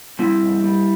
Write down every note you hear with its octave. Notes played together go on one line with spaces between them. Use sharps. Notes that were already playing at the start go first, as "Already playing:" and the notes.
G3 C4 E4
G2
G3